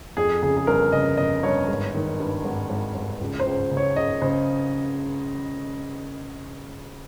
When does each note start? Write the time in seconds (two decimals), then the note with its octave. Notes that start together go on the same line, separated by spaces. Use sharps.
0.17 F2 G#4
0.43 C#3 G#4
0.57 G#4
0.67 G1 A#4
0.92 C#3 D#5
1.17 C#3 D#5
1.43 G1 C#5
1.69 G#1
1.95 D#3
2.20 G2
2.45 G#1
2.70 G#1
2.95 G#1
3.21 C#2
3.40 C5
3.46 C#2
3.71 C#3
3.77 C#5
3.96 C#2 D#5
4.22 C#3 C5